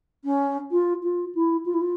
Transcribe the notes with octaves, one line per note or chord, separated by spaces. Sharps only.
C#4
F4
F4
E4
F4
E4
F4